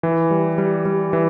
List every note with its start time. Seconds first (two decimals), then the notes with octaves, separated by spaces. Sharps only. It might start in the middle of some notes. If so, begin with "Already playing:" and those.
0.03 E3
0.31 G3
0.58 G3
0.85 G3
1.13 E3